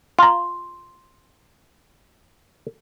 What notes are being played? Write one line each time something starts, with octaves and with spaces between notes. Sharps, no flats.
F4 A#5 C6